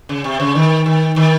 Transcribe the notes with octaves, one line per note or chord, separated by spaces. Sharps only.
C#3
C3
C#3
D#3
D#3
D#3